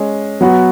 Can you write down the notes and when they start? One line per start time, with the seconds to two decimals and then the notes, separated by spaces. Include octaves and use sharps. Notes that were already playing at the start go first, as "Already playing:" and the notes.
Already playing: G#3 C#4 G#4
0.41 F#3 B3 F#4